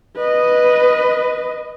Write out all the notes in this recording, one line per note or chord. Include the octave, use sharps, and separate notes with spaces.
B4 D#5